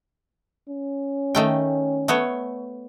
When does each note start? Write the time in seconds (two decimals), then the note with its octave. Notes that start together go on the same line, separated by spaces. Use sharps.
0.69 C#4
1.35 D#3 A3 G5
2.08 A3 B3 C#5